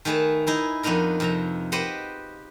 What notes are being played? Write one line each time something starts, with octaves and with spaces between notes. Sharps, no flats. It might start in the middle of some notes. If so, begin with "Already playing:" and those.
D#3 A3 G#4 B4 A5
D#4 E4 G#4
F2 B3 D4 D#4 A#4
F2 C3 A#5
G4 B4 C5 D#5 F#5